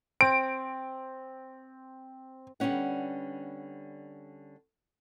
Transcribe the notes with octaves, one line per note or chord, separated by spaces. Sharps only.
C4 D7
D3 G3 B3 C#4 F#5